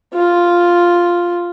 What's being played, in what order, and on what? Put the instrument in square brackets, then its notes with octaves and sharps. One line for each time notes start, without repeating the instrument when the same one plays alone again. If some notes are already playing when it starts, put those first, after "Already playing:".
[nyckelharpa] F4